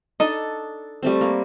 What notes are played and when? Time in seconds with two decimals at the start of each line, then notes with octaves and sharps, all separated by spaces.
0.20 D4 D#4 A4 D#5
1.03 G3 A3 C4
1.21 A#3